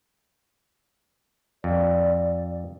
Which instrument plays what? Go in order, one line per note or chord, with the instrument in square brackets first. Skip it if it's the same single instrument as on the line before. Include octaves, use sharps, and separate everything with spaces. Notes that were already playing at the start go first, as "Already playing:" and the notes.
[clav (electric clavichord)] F2 [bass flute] D5